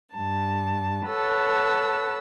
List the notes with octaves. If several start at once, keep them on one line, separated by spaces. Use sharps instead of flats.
G2 A5
A4 B4 C#5 F#5 A5 E6